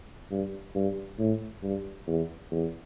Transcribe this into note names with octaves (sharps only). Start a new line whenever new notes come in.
G2
G2
A2
G2
E2
E2